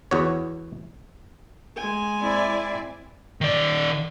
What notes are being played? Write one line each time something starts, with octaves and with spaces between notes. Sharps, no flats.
E2 F#4 C#5
G#3 G#5
C4 E4 D5
D#3 D5